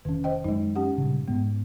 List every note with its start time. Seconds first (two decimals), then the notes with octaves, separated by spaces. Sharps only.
0.05 F1 D#3 C#4
0.24 C5 D#5 G5
0.44 F#2 G#3 D#4
0.75 C#4 G4 F#5
0.98 G2 A#2 C#3
1.28 G#2 G#3 B3